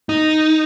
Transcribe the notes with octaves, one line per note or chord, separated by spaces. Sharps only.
D#4